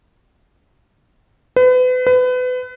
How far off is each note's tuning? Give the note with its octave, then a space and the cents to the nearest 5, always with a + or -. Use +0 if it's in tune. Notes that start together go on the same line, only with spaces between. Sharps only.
B4 +35
B4 +30